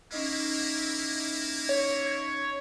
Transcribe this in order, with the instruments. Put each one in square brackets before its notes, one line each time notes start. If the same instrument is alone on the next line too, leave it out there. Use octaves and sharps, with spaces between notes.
[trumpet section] A#3 E4 [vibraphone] C#4 D#4 D#5
[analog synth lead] C#5